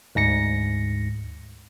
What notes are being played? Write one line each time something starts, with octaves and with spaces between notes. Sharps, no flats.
D2 G#2 A#6 C#7